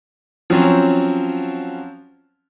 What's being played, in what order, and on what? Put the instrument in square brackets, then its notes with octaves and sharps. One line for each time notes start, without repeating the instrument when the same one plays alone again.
[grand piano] F3 F#3 C4 C#4